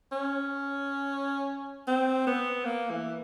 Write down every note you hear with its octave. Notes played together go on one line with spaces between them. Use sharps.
C#4
C4
B3
A#3
E3